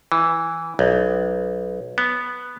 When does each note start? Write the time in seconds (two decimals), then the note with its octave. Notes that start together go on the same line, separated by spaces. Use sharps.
0.12 E3
0.79 B1
1.98 B3